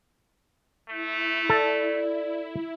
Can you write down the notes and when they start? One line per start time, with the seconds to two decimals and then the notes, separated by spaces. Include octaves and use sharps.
0.89 A3 E4
1.49 A4 D5